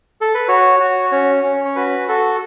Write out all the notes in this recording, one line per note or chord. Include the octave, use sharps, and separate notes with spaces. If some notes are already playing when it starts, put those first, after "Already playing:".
A4
B4
F#4 C#5
F#4
C#4 C#5
C#4
C#5
F#4 B4
F#4 A4